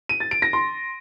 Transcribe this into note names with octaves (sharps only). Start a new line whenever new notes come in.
D#7
A6
D7
A#6
C6